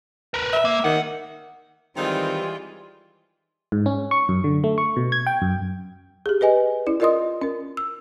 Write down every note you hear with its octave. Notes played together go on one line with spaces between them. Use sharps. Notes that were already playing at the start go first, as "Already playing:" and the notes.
A#4 B4
E5
A#3
D#3 F#5
D#3 E3 G3 G#3 C4 F4
G#2
C#4
C#6
F#2
D3
A3
C#6
B2
G#6
G5
F#2
G4 G#4
G#4 B4 D#5 G#5
C#4 E4 D5
F4 A#4 D5 D#5 C6 D#6
C#4 A#4
E6